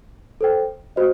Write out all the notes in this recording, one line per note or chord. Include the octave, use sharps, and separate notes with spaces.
A4 C5 G5
F#4 C5 D#5